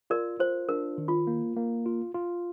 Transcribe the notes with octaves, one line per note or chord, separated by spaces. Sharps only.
F4 A#4 D5
F4 C5
D4 A#4
D#3
F4
A#3
A#3
F4
F4